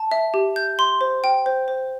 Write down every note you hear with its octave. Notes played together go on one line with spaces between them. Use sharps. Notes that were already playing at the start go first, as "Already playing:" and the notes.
Already playing: A5
E5
G4
G6
C6
C5
G5
C5
C5